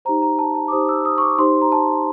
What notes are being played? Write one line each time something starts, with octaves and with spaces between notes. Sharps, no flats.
D#4 G4 C5 A#5
A#5
A5
A5
D6
D#4 G4 C5 D#6
E6
D#6
C#6
D6
D#4 G4 C5 C6
A#5
A5